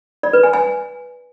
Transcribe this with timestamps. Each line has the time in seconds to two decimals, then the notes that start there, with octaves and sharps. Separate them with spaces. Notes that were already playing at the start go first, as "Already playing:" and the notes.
0.23 D5
0.33 B4
0.43 G#5
0.53 G#5